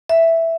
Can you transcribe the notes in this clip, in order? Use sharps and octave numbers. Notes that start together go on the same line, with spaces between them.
E5